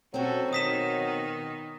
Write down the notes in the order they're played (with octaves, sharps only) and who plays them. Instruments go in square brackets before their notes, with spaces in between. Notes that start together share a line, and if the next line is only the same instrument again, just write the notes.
[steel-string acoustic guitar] B2 C4 [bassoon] F#3 [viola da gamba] C#4 F#4 A4
[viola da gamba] D#3 B3 D#4 [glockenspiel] D#6 B6 E7